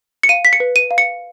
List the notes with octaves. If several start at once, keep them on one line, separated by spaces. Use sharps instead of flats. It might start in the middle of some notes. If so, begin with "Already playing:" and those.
C#7
F5 D#7
B6
C#7
B4
D#7
F5
C#7